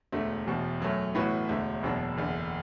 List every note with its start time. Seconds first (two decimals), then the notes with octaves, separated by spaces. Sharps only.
0.12 E1 D2 D3 A3
0.46 E1 E2 B2
0.80 F#2 F#3 A3
1.15 A1 A2 E3 B3 F#4
1.49 E1 D2 D3
1.83 F#1 E2 B2 F#3 D4
2.17 F#1 E2 D3